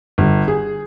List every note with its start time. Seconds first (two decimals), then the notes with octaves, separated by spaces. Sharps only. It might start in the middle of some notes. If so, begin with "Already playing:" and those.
0.18 G1
0.48 G#4